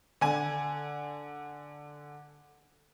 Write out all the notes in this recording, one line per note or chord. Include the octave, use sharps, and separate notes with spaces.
D3 G#5